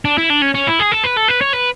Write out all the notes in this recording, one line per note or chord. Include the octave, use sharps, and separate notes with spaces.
D4
E4
D4
C#4
C#4
E4
G#4
A4
B4
A4
B4
C#5
B4